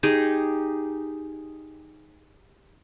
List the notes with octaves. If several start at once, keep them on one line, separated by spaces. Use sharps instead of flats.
D#4 G4 G#4